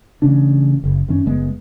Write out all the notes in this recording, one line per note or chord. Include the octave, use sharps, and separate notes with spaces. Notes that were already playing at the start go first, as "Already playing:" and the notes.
A1 C#3 C#4 D4
F#1
F#2 D#3 C#4
F#1 G#3 B3